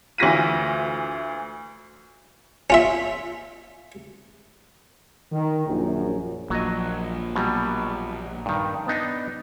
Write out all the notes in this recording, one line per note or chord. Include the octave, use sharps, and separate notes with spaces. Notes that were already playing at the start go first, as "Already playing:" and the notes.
D2 E3 F4 A#6 B6 D#7
C#4 F4 E5
D#3
A#1 F#2
A#1 A#2 F#3 D#5
B2 F#3 G3
G2 D#3
B3 D4 D#4